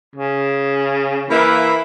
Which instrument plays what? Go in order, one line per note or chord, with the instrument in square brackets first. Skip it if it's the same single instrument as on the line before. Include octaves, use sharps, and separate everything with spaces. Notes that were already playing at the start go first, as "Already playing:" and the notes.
[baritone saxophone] C#3
[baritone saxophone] E3 [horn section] A#3 E4 B5